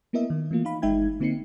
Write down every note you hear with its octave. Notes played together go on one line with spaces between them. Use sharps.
A#3 B3 E4 A#4 D#5 E5
D#3
E3 A3 A#3 F4
D#4 F5 B5
G1 G#3 D#4 E5 G5 G#6
D3 A#3 C4 D#4 C7 C#7